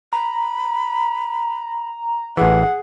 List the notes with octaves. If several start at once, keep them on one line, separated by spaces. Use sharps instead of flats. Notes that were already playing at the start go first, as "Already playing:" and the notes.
A#5 B5
A1 E3 G#4 F#5